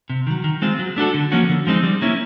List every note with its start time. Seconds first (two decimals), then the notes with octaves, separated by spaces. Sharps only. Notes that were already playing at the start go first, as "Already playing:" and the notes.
0.10 C3
0.27 D#3 F#3
0.44 D#3
0.62 G#3 C4 F4
0.79 F#3
0.96 A3 D4 F#4 A4
1.14 D3
1.32 F3 A#3 C#4 F#4
1.49 D3
1.67 F3 G#3 C4 D#4
1.84 G3
2.01 A#3 C#4 E4